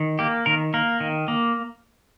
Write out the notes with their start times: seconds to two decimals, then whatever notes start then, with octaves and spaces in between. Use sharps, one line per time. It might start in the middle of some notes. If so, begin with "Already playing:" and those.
Already playing: D#3
0.19 A#3 G4
0.46 D#3 A#4
0.74 A#3 A#4
1.00 D#3
1.28 A#3